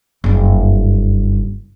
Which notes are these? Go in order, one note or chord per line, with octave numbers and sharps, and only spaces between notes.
F#1 G2